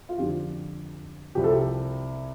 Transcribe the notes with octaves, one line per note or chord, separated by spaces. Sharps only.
F4
F2 D3 F3 G4
C2 C3 F3 C4 G4
A4
G4